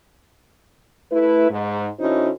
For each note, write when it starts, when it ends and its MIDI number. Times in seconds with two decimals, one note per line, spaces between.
1.11 1.49 57
1.11 1.49 64
1.11 1.49 71
1.50 1.87 44
1.98 2.29 50
1.98 2.29 61
1.98 2.29 63
1.98 2.29 64
1.98 2.29 66
1.98 2.29 72